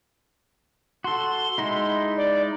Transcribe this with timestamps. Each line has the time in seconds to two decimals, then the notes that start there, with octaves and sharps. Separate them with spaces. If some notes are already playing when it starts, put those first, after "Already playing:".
1.04 F#4 A4 C6
1.58 G#3 D#4 E4
2.17 D5